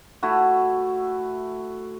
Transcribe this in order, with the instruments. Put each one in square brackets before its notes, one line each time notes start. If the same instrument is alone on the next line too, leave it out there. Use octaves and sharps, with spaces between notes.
[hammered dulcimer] A3 E4 F#4